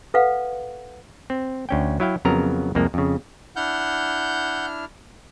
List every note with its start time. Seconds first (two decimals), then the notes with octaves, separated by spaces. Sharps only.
0.14 A4 B4 F5 F#5
1.30 C4
1.69 D2 C#4 G5
2.00 F#3 E4 F5 G5
2.25 F2 C#3 F#3 B3 A#4 A#5
2.75 C2 F2 G#3 A#3
2.94 F2 C#3
3.56 D4 E4 F#5 F6 G6